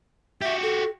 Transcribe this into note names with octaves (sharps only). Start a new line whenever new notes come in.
F#4 G4 E5
A4